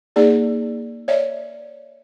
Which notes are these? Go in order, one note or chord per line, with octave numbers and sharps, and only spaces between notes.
A#3 D#4 G#4 D5
C#5 D5 E5